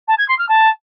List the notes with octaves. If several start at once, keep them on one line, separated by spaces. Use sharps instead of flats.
A5
G#6
C6
F6
A5